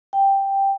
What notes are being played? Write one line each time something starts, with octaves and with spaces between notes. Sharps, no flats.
G5